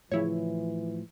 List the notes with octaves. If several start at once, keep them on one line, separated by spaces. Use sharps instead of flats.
A2 C#3 E3 F3 E4 C#5